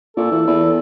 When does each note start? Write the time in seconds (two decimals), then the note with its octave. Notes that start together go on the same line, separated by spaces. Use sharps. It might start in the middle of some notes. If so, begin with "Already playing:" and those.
0.17 A#2 A4
0.31 E3
0.47 E2